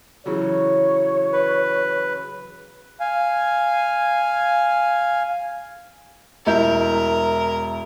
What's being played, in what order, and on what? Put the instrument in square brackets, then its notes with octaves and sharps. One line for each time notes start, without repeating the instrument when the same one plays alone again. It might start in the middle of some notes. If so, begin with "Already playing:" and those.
[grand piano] C#3 E3 F#3 [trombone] C#5
[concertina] B4
[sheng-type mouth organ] F5 G#5
[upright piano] E1 E4 G6 [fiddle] A#4